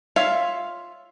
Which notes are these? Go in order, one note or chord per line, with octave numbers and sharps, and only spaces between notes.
F4 C#5 E5 F5